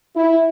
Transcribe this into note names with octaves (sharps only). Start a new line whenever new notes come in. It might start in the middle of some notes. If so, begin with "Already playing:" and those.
E4